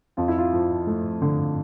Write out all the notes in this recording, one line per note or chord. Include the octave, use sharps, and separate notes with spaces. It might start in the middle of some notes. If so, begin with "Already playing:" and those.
F2 F4
E4
F4
F3
A3
D3